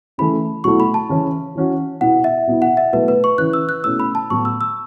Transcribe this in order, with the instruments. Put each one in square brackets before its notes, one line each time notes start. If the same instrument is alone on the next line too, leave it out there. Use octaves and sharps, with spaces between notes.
[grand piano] C#3 E3 A3 [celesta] B5
[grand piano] B2 F#3 A3 E4 [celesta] C#6
[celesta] B5
A5
[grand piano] C#3 E3 C#4 E4
E3 C#4 F#4
[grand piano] B2 B3 E4 [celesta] F#5
[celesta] E5
[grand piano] B2 B3 E4
[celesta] F#5
E5
[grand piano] B2 F#3 A3 E4 [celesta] B4
[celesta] B4
C#6
[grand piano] C#3 E3 C#4 E4 [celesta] F#6
[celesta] E6
F#6
[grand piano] B2 A3 C#4 E4 [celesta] E6
[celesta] B5
A5
[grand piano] A2 F#3 B3 F#4 [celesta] C#6
[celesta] E6
E6